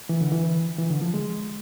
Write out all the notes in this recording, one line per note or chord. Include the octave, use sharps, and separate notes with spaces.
E3
D3
E3
E3
D3
F3
G#3